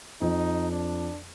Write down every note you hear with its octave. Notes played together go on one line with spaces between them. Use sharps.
F2 D#4
D4